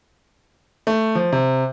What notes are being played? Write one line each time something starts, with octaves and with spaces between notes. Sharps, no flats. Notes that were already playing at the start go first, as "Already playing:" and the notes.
A3
F3
C3